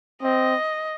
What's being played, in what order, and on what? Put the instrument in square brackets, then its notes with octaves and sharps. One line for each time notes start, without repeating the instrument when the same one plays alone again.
[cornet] C4 [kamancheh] D#5